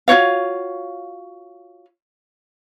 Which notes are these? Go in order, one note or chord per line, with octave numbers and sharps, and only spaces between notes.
F4 F#4 C#5 F5